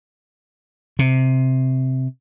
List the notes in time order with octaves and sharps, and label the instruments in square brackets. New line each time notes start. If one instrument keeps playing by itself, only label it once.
[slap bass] C3